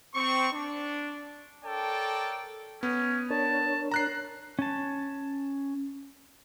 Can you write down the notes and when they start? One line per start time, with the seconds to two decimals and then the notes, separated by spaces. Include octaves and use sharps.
0.15 C4 C#6
0.53 D4
1.65 A4 A#4 C#5 D5 G5 A5
2.83 B3 C#4
3.30 D4 A#4 C#5 A5
3.91 A#5 F#6 C7
4.59 C#4 A5